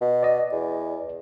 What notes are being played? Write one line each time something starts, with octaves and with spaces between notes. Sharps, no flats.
B2
D5 D#5
E2